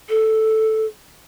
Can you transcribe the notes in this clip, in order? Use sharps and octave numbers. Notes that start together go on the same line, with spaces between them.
A4